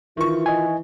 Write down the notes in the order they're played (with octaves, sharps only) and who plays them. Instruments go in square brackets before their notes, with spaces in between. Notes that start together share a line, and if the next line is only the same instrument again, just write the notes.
[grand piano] D#3 C#6 [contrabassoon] E3 [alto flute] F4
[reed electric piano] D#5 G#5